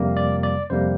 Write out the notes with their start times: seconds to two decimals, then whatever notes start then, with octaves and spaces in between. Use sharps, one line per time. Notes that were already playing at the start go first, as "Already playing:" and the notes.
Already playing: F2 C3 G3 A#3
0.17 D5
0.43 D5
0.70 F2 C3 G3 A#3 C5